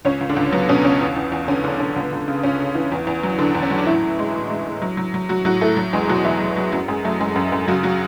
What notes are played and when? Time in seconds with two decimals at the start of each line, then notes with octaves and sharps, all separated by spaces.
0.05 C#2 C#4 C#5
0.21 C#2
0.29 D3 D4
0.37 C#2
0.52 F#3 B3
0.69 B2 C#4
0.84 C#2 C#4
1.01 E2
1.16 E2
1.32 E2
1.48 D3 C#4
1.64 D3 D4
1.80 D3 C#4
1.96 C#2 B3
2.12 C#2
2.28 C#3
2.43 C#2 C#4
2.60 C#3
2.75 E3
2.92 E2
3.07 E2
3.23 F#3
3.38 D3 D4
3.55 E2
3.63 C#4
3.71 F#3
3.78 D4
3.87 A2 E3 E4
4.02 A2
4.19 G#3
4.34 A2
4.50 G#3
4.65 A2
4.82 F#3
4.97 F#3
5.14 F#3
5.29 F#3 F#4
5.45 A2 F#3 F#4
5.61 A2 A3 A4
5.77 F#3
5.93 E2 G#3 G#4
6.09 B2 F#3 F#4
6.25 E2 E3 E4
6.40 F#3
6.57 F#3
6.72 F#2 F#3 F#4
6.88 F#2 G#3 G#4
7.05 F#3 A3 A4
7.20 F#2 G#3 G#4
7.36 F#2
7.52 F#2
7.68 C#3 F#3 F#4
7.83 F#3 F#4